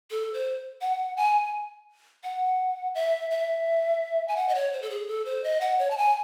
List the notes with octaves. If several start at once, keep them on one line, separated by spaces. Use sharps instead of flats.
A4
C5
F#5
G#5
F#5
E5
E5
G#5
F#5
D#5
C#5
C5
A4
G#4
A4
C5
D#5
F#5
C#5
A5
G#5